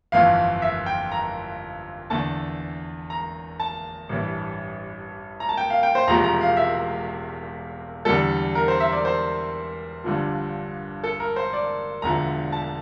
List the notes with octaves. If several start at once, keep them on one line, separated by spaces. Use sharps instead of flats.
G1 F2 E3 A3 F5
E5
G5
A#5
E2 D3 A3 A5
A#5
A5
A1 G2 E3
A#5
A5
G5
F5
G5
C5
E1 E2 C3 F3 A3 A#5
A#5
F5
E5
E2 D3 G3 A4
A#4
C5
E5
D5
C5
G1 G2 D3 F3
A4
A#4
C5
D5
E1 D2 D3 F3 A#5
A5